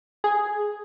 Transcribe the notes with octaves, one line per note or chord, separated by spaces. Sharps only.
G#4